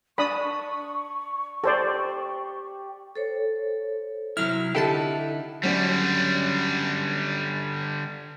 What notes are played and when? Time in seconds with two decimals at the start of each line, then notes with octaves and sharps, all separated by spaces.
0.18 D4 B5 C#6 D#6
1.64 G4 A4 C5 D5
3.16 A4 C5 C#5
4.37 C3 F#3 E4 F6
4.75 D3 D#4 E4 G4 A4 A5
5.63 D3 F#3 G3 C#4 D5